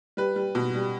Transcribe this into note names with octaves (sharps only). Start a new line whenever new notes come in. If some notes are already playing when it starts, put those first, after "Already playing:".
G3 B4
G3
B2
G3